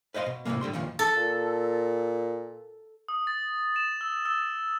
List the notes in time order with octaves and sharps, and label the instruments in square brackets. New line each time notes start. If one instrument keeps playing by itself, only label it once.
[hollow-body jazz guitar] B4 C5 D#5 F5 C6
B2
A2 C3 F3 G#3 A#3
A2 D3 G3 C6
F2 A#2 D#3 F3
[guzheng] A4
[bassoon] A#2
[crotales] D#6
A6
E7
E6
E6